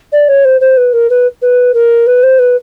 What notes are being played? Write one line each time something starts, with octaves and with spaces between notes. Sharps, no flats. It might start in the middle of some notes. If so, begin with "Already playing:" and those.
D5
C#5
C5
C5
B4
A#4
B4
B4
A#4
B4
C5
B4